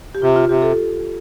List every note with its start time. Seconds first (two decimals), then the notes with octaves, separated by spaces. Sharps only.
0.15 G4
0.22 C3 F4
0.36 F4
0.49 C3 G4
0.62 A4